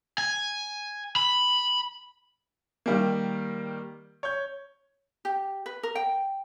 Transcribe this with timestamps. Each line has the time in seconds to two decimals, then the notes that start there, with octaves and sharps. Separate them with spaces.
0.18 G#5
1.16 B5
2.86 D#3 G3 A#3
4.23 C#5 G6
5.25 G4
5.66 B4
5.83 A#4
5.95 G5